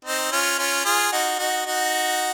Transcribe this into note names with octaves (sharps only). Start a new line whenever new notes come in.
C4 D#4
C#4 F4
C#4 F4
F4 G#4
D#4 F#4
D#4 F#4
D#4 F#4